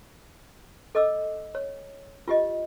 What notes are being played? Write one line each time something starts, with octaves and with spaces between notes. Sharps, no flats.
A4 D#5 D6 E6
C#5
F4 G4 D#5